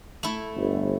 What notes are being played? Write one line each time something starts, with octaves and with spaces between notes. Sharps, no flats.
A3 E4
G1